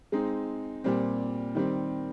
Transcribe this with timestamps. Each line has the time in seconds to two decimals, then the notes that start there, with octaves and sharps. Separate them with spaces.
0.12 G#3 C4 D#4
0.84 A#2 G3 C4
1.55 D#3 G3 C4